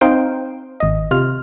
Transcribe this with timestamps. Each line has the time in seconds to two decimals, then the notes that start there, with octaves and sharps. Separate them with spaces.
0.01 C4 D#4 C5 F5 G5
0.80 G#1 D#5
1.11 C3 F4 F6